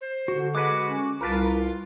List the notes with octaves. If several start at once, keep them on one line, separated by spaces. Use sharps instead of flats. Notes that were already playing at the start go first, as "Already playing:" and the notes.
C5
D3 F#4
G#3 F#4 B4 D6
C#4
C2 F4 A#4 B4 A5